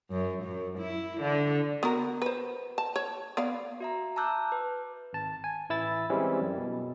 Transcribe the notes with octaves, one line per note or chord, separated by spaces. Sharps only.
F#2
F#2
E4
D3
B3 F#4 A#4
B4 C5
A5
C#5
B3 D5 F5
F#4 E5 A#5
A5 A#5 D6 E6 F#6 G6
B4
G#1 A5
G#5
A1 E3 E4 E6 A6
E3 G3 G#3 C4 C#4
F#2
B2